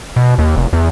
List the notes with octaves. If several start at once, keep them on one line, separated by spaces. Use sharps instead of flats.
B2
D#2
F1
E2